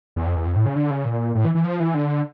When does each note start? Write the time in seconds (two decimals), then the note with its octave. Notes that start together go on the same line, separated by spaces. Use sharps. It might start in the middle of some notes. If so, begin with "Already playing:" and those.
0.16 E2
0.26 F2
0.36 E2
0.46 F2
0.56 A2
0.66 C#3
0.76 D3
0.91 C#3
1.05 A#2
1.35 A2
1.45 E3
1.55 E3
1.64 F3
1.80 E3
1.94 D3